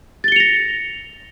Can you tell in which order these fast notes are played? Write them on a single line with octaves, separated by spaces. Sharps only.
A6 G7 C#7 F7 A#6